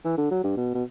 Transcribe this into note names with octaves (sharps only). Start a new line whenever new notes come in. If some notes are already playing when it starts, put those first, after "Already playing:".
E3
D3
F#3
G2
B2
B2